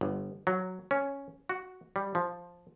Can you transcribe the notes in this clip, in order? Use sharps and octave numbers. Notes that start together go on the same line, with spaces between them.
G1
F#3
C#4
F#4
G3
F3